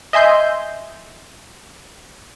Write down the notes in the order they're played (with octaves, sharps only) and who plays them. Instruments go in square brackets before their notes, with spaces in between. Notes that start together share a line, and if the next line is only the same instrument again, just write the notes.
[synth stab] D#5 E5 G#5 C6 G6